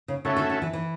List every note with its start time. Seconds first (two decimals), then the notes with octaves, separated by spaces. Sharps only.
0.08 C#3
0.24 C#3 A3 C#4 F#4 A4 E5
0.37 D3
0.50 D3
0.62 E3
0.73 E3